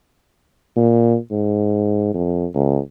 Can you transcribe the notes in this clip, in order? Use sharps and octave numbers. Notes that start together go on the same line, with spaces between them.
A#2
G#2
F2
C#2